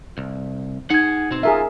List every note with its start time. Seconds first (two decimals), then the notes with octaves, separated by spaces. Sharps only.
0.18 C2
0.90 D#4 G#4 F#5 G#6
1.31 B2 C4
1.43 F4 G#4 A#4 E5